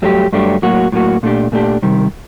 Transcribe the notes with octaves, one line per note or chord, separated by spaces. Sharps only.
G2 F#3 A3 D4 G4
G2 F#3 A3 D4 G4
A2 F#3 A#3 F#4
A2 F#3 A#3 F#4
A#2 A3 D4 G4
A#2 A3 D4 G4
C3 D#3 G3